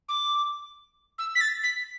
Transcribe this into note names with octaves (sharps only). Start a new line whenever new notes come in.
D6
E6
B6
A6
B6